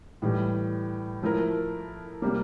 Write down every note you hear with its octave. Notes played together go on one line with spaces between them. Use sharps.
A2 E3 G3
F3 A3 E4 A#4
C3 G3 A#3